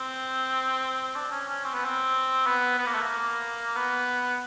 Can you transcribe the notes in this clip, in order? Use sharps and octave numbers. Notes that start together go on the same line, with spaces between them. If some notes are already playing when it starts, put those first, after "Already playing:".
Already playing: C4
D4
C#4
C#4
C4
B3
C4
B3
B3
A#3
A3
A#3
B3